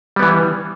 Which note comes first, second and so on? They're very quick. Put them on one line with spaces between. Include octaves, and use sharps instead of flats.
G3 B3 E3